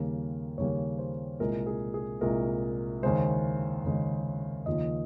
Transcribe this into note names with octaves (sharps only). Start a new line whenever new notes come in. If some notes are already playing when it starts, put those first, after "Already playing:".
Already playing: D#2 C#3 G3 A#3 A#4
D#2 C#3 G3 A#3 C#5
C5
C2 A#2 G#3 A#4
G#4
G#4
C2 A#2 G#3 A#4
D#2 C#3 G#3 C5
D#2 C#3 G#3
D#2 C#3 F3 A#3 D#5